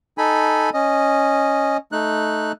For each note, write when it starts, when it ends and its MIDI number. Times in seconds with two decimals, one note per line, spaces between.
0.18 0.70 63
0.18 0.70 69
0.18 0.70 80
0.18 0.70 83
0.74 1.77 61
0.74 1.77 75
1.92 2.52 57
1.92 2.52 63
1.92 2.52 90